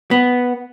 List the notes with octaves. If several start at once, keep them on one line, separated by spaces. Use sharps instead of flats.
B3